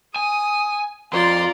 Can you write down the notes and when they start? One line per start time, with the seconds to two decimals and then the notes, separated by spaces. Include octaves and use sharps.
0.16 G#5 D#6
1.13 F2 F4 D5 A#5 C6